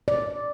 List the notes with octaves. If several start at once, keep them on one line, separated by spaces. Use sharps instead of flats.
D5